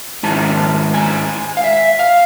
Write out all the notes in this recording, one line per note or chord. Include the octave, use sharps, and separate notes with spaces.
G#2 D#3 G#3 C#4 E4 A5
G#5
F5
E5
F5